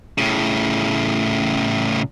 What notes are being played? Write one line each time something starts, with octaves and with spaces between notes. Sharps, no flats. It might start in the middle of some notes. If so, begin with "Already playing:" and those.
A2 C#3